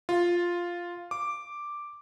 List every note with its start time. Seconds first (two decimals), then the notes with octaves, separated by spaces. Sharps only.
0.09 F4
1.11 D6